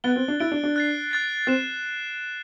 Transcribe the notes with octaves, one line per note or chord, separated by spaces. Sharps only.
B3 F#6 A6 D7 G7
C4
D4
E4 F#6 A6 D7 G7
D4
D4
F#6 A6 C7
F#6 A6 C7
C4 F#6 A6 E7